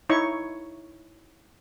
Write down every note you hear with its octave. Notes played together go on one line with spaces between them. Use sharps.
D#4 E4 C#5 C#6